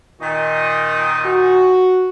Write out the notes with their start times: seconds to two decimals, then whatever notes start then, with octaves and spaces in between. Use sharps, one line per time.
0.21 A#2 D#3 D#4
1.26 F#4